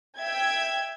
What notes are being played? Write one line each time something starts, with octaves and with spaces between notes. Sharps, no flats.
E5 G5 G#6